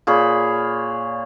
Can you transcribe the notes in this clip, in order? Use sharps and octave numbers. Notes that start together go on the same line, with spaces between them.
A#2 G#4 C#5 B5